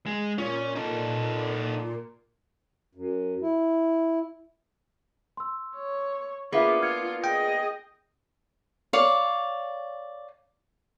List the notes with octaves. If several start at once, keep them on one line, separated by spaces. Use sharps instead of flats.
G#3
A#2 C#4
D#4 A4
F#2
E4
C6 E6
C#5
A#3 B3 D4 F4 G#4 E5
F4 F6 G#6 C#7
G#4 D#5 G5
C#5 D5 F5